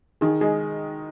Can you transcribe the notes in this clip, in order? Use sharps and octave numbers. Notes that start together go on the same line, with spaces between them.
D#3 G#4
G#3 G#4